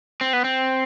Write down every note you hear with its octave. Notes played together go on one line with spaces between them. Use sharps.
C4
B3
C4